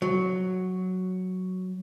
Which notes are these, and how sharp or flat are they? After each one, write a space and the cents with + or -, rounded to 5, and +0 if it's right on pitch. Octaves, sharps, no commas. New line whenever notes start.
F#3 +0